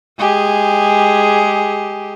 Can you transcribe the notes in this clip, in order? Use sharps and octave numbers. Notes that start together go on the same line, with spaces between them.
G#3 G4 G#4